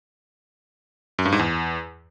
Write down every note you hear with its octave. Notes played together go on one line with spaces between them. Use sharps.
F#2
G2
G#2
E2